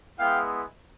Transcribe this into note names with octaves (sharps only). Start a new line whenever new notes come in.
G#3 B3 E4 F5 G5